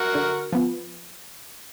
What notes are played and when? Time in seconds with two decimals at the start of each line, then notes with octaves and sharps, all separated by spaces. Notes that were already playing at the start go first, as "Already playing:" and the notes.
Already playing: F#4 A#4
0.15 D3
0.52 F3 B3